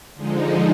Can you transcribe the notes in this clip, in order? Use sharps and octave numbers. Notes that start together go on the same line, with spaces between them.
D3 F3 G#3 D#4